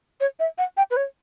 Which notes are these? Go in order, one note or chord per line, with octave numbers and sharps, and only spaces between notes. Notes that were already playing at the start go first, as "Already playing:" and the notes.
C#5
E5
F#5
G5
B4
C#5